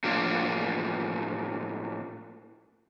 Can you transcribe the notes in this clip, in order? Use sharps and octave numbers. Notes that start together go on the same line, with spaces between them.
A2 F3 A#3 D4 F4